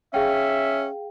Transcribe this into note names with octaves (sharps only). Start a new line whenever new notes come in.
C#4 G#4 E5 F5 G5